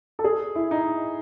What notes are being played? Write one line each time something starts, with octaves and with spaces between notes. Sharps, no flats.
A4
G#4
E4
D#4